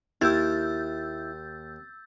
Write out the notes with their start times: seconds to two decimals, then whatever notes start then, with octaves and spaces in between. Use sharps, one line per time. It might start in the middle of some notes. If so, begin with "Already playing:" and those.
0.21 D#2 E4 E6 G6 A6